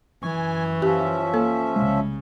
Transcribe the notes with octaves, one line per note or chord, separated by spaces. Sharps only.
F#2 E3 G#5 C#6
F3 C#4 G4 E5
A#3 A4
C2 C#3 G#3